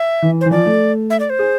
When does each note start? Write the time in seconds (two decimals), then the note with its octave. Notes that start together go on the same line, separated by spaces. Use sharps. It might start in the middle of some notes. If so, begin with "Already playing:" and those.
Already playing: E5
0.22 E3
0.41 E3 C5
0.51 F3 D5
0.66 A3
1.10 E5
1.20 D5
1.30 C5
1.39 G#4